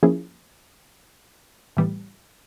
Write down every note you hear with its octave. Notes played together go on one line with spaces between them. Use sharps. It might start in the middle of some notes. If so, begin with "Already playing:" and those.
F3 A#3 C#4 E4 G#4
A2 E3 G3 B3